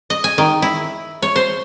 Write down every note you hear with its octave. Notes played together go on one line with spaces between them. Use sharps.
D#5
G#5
D#3
E4
C#5
C5